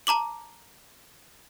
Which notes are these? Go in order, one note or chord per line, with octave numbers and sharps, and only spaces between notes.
A5 A#5 D6 F#7